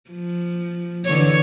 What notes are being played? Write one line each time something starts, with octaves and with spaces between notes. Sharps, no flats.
F3
D3 E3 C#5